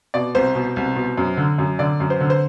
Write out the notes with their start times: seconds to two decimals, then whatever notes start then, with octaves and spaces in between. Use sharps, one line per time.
0.14 B2 D5
0.35 C2 C5
0.55 B2
0.76 C2
0.96 B2
1.17 F#2
1.37 D3
1.58 F#2
1.79 D3 D5
2.00 F#2
2.10 C5
2.20 D3
2.30 C5